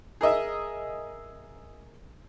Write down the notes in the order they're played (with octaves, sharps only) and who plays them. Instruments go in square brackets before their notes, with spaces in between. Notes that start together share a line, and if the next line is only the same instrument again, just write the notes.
[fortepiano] G#4 A#4 D#5 E5